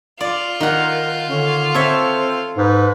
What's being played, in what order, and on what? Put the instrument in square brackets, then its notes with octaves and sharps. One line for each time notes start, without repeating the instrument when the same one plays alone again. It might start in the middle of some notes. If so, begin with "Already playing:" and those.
[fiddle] F4 [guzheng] D5
[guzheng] D#3 F#5 [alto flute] A#4
[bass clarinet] D3 [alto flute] C#4
[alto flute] C4 [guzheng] A4 C#5 E5
[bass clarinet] G#2 [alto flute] B4